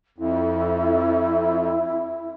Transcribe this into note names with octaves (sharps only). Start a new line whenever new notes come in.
F2 E4